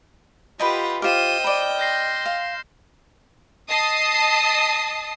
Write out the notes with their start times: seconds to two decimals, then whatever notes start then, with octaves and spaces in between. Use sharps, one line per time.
0.60 F4 G4 B4 D#5 F#5 G5 B5
1.02 F4 G4 C5 D#5 G5 F6 D#7 E7
1.44 D5 B5
1.79 C6 G6 A#6 C7
2.26 F5
3.69 D#5 A5 D#6 C7